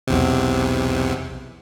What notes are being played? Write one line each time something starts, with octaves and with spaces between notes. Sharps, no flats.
B1 E2 C3